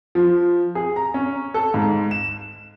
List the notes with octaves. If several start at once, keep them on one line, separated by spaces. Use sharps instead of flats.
F3
G#4
A#5
C#4
A4
G#2
E7